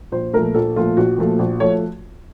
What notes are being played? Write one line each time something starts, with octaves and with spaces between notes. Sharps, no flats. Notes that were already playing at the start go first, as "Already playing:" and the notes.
A#1 C5
A#2 F3 A3 A#4
A#1 A4
A#2 F3 A3 F4
A#1 F#4
A#2 F3 A3
A#1
F3 A3 C#5